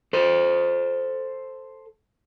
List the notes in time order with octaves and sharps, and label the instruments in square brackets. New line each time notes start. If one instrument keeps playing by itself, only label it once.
[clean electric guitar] A4 C5